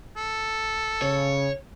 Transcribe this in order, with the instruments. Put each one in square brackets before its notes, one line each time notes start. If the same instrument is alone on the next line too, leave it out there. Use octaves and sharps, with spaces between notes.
[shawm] A4
[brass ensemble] C#3 [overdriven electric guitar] C#5